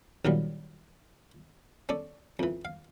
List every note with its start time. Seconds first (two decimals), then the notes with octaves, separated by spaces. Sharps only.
0.25 A#1 D#3 F#3 G3
1.89 C#4 A4 D5
2.39 F2 E3
2.65 F5